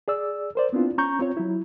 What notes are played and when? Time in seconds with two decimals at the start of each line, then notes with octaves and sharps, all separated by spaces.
0.08 G#4 D5 E6
0.55 A#4 C5 D5
0.73 B3 C4 D4 E4 F4
0.98 C#4 A#5 C#6 G6
1.19 C4 F4 C#5
1.37 F#3 E4